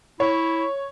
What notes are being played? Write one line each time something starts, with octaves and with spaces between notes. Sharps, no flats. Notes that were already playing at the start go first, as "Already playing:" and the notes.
E4 C#5